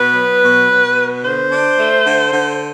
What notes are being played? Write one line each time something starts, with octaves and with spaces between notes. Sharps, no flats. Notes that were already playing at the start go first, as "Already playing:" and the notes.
Already playing: B2 B3 B4
F#3
B2
B2
B3
D3 C5
D4
A3
D3
D3